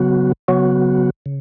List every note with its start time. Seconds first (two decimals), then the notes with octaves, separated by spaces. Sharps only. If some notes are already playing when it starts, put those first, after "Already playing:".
Already playing: C#3 F#3 B3 F#4
0.48 C#3 F#3 B3 F#4
1.26 C#3